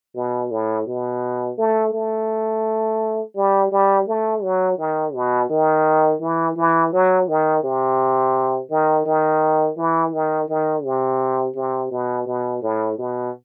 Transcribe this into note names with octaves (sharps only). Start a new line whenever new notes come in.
B2
A2
B2
A3
A3
G3
G3
A3
F#3
D#3
B2
D#3
E3
E3
F#3
D#3
C3
D#3
D#3
E3
D#3
D#3
C3
C3
B2
B2
A2
B2